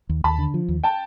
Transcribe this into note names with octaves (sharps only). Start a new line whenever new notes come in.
D#2
D#2 A5 B5
D3
F3
D#2
G5 A5